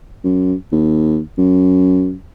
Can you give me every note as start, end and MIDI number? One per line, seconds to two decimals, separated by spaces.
0.24 0.54 42
0.72 1.20 39
1.38 2.15 42